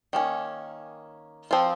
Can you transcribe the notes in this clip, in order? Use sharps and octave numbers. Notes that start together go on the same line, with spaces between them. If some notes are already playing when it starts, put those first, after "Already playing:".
D#3 A#3 C#4
F3 C4 F4